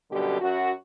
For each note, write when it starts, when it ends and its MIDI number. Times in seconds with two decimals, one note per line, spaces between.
0.11 0.38 42
0.11 0.38 47
0.11 0.38 50
0.11 0.38 55
0.11 0.38 67
0.41 0.71 42
0.41 0.71 66